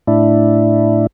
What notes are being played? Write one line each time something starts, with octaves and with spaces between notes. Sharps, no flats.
A2 D4 E4